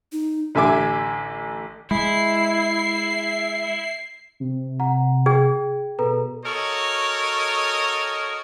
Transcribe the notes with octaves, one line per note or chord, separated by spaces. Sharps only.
D#4
A1 D3 E5 G#5 D6
G#3 E4 C7
C3
F#5 A#5
G#4 G5 G#6
B2 A4 B4 A#5
F#4 A4 A#4 C#5 D#5